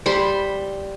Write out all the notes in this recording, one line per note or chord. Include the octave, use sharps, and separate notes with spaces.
G3 C5 B5 C6